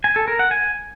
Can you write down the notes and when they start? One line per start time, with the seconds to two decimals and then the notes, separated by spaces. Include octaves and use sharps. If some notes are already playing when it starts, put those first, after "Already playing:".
0.04 G#5
0.16 A4
0.28 A#4
0.39 F#5
0.51 G#5